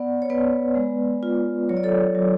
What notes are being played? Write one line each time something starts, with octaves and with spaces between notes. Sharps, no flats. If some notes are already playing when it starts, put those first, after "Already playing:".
Already playing: B3 D5 F#5
C#5
B3 B4 D5
G#3
F4
F#3 C#5
D5
A4 C#5
F#3